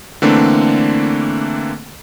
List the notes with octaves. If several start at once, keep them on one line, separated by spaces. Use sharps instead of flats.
D3 E3 A3 A#3 C4 D4